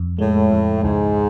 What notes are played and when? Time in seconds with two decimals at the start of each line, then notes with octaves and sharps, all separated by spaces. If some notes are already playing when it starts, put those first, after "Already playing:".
Already playing: F2
0.19 A2 G#3
0.51 F2
0.82 C#2 G#2